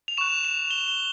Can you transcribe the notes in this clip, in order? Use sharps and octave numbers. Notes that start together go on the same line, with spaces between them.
F7
C#6 F#6 E7
F7
G7
G7